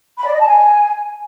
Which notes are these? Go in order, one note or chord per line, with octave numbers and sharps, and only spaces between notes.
B5
D5
D#5
A5
G#5